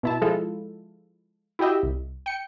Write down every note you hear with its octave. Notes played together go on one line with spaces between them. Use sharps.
B2 E4 A5
F3 G#3 E4 F4 A4
E4 F#4 G4 D#5 E5
C2
G5 C#7